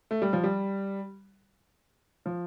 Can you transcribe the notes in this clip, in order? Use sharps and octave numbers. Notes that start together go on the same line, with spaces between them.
A3
G3
F3
G3
F3